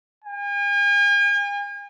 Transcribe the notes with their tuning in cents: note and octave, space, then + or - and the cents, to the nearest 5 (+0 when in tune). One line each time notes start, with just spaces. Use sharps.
G#5 -45